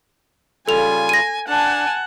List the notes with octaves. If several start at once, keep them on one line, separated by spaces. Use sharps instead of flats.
C#3 G3 F4 A4 G#5 F7
A#6 D#7
D4 F#5 G#5 A5